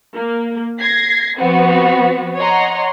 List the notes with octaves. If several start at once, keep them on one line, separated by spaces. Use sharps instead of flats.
A#3
G#6 A#6 C7
F3 B3 C4 F#4
C#5 D#5 F#5 A#5 C6